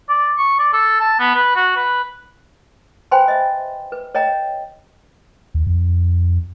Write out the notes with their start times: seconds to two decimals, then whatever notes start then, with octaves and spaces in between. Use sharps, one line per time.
0.09 D5
0.38 C#6
0.59 D5
0.73 A4
1.00 A5
1.19 B3
1.35 B4
1.56 F#4
1.76 B4
3.11 B4 C5 G5 G#5 B5 C6
3.28 D#5 E5
3.92 B4
4.15 C#5 D#5 G5 A#5
5.54 D#2
5.67 F2